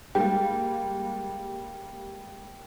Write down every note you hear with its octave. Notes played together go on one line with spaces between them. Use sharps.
G3 G#3 A#3 G5